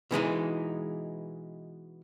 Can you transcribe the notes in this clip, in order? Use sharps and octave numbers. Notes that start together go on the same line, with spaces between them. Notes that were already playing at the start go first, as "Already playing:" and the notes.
B2 E3 G#3 D#4